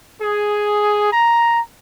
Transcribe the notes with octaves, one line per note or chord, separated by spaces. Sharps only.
G#4
A#5